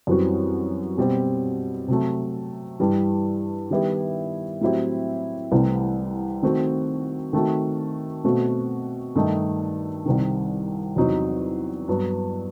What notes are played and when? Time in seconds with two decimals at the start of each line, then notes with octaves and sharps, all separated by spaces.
0.07 F#2 E3 G3 C4 F#4
0.98 B2 G3 C4
1.88 C3 F#3 A3
2.80 G2 E3 G3
3.70 D#3 G3 B3 E4 G4
4.61 A2 F#3 C4 E4 G4
5.52 C2 C3 E3 A3
6.43 D#3 A3 C4 F#4
7.33 D#3 A3 C4 F#4
8.24 B2 A3 C4 F#4
9.16 G2 D#3 A3 D#4
10.06 C2 C3 D#3
10.96 E2 C3 F#3 C4 D#4
11.88 G2 F#3 B3